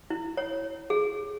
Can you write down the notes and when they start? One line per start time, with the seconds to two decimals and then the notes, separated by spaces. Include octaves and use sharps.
0.10 E4
0.37 C#5
0.90 G#4